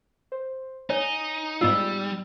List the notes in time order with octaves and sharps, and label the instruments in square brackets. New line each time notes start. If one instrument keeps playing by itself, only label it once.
[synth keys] C5
[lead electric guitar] D#4 [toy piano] C#5 [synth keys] G#5
[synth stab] G#2 F4 [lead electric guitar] G3 [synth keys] B3 D#4 [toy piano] E6